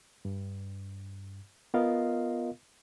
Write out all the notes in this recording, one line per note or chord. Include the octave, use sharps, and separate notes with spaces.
G2
B3 F4 A#4 D#5 F5